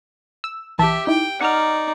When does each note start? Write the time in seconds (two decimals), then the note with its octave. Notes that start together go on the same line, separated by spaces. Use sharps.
0.44 E6
0.78 B1 E3 G4 E5 A5
1.07 D#4 E4 G5
1.41 D#4 D5 F#5 F6